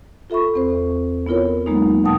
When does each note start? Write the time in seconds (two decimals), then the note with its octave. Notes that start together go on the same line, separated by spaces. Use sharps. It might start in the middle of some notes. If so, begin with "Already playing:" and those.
0.30 F4 A4 E5 B5 C#6
0.54 E2 C4 C5
1.26 B3 E4 F4 A#4 C#5
1.66 F#3 G#3 A#3 B3 D#4
2.04 D2 B2 G5 A5 D#6